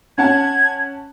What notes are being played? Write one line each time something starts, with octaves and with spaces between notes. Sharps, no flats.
C#4 F#5 A5 G#6